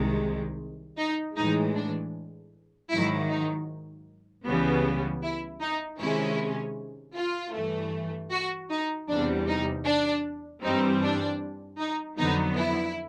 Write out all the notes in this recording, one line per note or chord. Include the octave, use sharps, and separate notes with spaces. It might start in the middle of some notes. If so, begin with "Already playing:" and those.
Already playing: C2 C3 D#3 G#3
D#4
A2 E3 G#3 D#4
D4
G#2 D#3 F#3 E4
D#4
C#2 C#3 E3 G3 B3
E4
D#4
C3 D#3 G#3 C#4 E4
F4
G2 E3 A3
F#4
D#4
E2 C3 E3 G3 D4
D#4
D4
G2 E3 G3 C4 D#4
D4
D#4
F2 D3 F#3 B3 D#4
E4